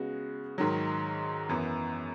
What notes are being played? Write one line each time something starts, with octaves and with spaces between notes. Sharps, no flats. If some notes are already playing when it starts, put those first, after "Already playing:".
Already playing: C#3 G#3 B3 F#4
G#2 D#3 F#3
F#2 E3 B3